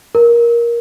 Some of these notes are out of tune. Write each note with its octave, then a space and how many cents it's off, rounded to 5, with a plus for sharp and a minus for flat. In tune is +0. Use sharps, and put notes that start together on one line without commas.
A#4 +15